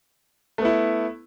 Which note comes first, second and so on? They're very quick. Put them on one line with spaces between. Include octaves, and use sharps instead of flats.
A3 B3 E4